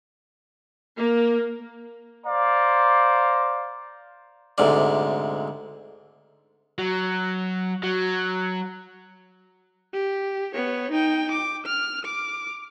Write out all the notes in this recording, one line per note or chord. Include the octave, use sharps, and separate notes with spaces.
A#3
C5 D5 F5 A#5
D2 G#2 C3 D5
F#3
F#3
G4
B3 C#5
D#4 G5
D6
F6
D6